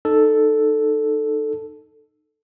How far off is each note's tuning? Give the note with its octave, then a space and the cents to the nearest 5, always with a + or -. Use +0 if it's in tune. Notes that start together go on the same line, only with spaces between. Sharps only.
D#4 -25 A4 +0